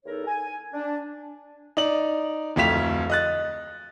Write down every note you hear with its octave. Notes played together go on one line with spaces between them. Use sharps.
E2 D#4 A4 A#4 C#5
G#5
D4
D#4 D5 F#7
D1 F2 A3 F5 B6 F7
D#5 F#6 A6